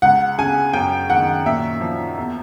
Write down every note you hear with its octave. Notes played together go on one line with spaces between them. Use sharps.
C#2 F#5
C#3 G#5
F#2 G5
D#3 F#5
A#2 E5
F3
E2